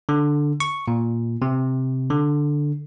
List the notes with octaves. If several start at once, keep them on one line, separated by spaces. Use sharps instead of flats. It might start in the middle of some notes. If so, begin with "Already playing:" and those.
D3
C#6
A#2
C3
D3